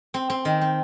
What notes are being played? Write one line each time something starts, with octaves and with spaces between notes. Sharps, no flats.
C4
C4
D#3
C4